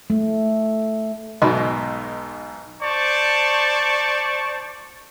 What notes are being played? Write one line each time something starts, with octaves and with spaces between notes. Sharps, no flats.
A3
B1 G#2 B2 D#5 B5 C6
C5 D5 A5 C#6